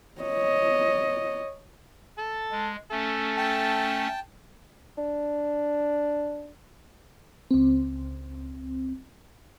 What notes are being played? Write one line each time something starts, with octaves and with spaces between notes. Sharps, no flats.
C#5 D#5
A4 A5
G#3
A3 C#4 A4
G5 A5
D4
C#2 C4